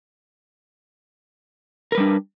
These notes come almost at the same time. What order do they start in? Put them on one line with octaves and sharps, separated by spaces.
A#4 B4 G3 D4